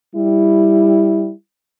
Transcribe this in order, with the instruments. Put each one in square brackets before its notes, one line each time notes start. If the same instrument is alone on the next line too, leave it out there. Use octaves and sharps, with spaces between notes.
[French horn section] G3 E4